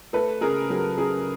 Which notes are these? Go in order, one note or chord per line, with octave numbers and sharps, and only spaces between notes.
A3 A4 B4
C#3 G#4 A#4
F#3 G#4
C#3 G#4